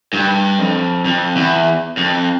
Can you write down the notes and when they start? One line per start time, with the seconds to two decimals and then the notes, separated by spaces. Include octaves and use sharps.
0.13 G2
0.59 F2
1.05 F2
1.36 E2
1.97 F2